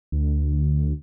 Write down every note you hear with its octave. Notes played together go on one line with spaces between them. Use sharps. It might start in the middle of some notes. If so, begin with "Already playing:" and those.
D2